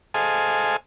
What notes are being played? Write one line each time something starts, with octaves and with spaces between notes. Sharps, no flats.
G#4 A4 C5 D#5 F5 G#5